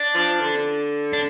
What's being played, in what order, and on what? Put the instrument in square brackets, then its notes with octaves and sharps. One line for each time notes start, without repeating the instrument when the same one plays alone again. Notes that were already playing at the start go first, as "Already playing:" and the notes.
Already playing: [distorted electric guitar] D4
[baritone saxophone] F3
D3
[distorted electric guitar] D4